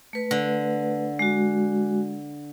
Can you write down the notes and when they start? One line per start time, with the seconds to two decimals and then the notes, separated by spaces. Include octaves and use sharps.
0.13 A3 B4
0.31 D3
1.19 G#3 F#4